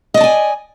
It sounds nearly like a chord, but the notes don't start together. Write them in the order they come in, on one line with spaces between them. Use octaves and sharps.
D#5 D5 A5 G#5